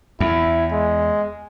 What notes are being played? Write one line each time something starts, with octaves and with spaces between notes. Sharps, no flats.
E2 E4
G#3